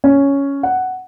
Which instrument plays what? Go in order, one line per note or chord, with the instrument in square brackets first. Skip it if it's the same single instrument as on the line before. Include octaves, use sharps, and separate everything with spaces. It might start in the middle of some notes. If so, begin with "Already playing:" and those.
[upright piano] C#4
F#5